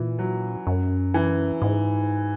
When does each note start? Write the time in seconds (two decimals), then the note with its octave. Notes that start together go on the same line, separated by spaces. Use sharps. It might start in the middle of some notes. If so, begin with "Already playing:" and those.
Already playing: A#2 E3
0.19 F#3
0.67 F#2
1.14 E3
1.62 G#2